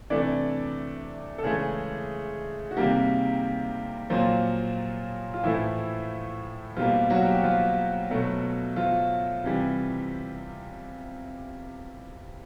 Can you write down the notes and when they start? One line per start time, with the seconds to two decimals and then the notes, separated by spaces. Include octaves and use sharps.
0.10 C3 E3 A3 D4 D5
1.38 A4
1.43 C#3 E3 G#3 A3 G#4
2.71 F#4
2.77 C3 D#3 G3 A#3 G4
4.10 A#2 F3 F#3 A#3 F4
5.34 F4
5.43 A2 E3 F3 A3 E4
6.76 B2 F3 G3 A#3 F4
7.10 F#3 F#4
7.26 G4
7.35 F#4
7.44 F3 F4
8.10 B2 F#3 A3
8.76 F3 F4
9.44 C3 E3 G3